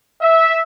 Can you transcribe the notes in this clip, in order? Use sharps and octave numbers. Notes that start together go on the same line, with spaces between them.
E5